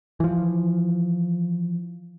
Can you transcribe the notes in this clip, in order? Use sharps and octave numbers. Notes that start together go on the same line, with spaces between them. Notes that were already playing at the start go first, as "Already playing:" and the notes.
E3 F3